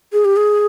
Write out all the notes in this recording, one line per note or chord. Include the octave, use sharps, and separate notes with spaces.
G#4
G4
G#4